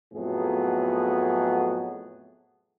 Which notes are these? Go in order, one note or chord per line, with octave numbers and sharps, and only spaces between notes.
F2 A2 F#3 B3 G#4